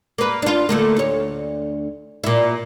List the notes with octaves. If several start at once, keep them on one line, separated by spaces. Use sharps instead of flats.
A#3 B4
D4 F4
D3 A3 A#3
D2 C#5
A#2 E4